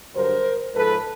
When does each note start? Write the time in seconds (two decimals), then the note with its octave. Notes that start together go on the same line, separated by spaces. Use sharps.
0.14 G2 D3 F#3 A#4 C5
0.74 G#2 F3 A4 B4